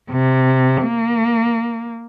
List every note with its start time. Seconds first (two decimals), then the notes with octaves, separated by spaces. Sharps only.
0.11 C3
0.83 A#3